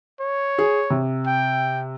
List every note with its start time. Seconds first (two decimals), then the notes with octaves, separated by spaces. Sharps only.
0.20 C#5
0.58 G#4
0.90 C3
1.27 G5